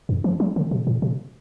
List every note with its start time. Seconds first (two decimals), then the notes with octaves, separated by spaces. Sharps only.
0.09 F#2
0.24 E3
0.40 F#3
0.56 D3
0.71 B2
0.87 A2
1.02 B2